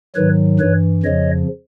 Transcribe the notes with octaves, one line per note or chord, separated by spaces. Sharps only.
G#2 D#3 F#3 B4 C#5
G2 E3 B4 C#5
F2 C#3 F3 C#5 D#5